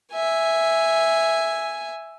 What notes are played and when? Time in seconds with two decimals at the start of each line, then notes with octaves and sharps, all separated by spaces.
0.13 E5 G#5